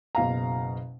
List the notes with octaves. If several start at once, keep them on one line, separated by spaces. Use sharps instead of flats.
F#1 B2 F5 A#5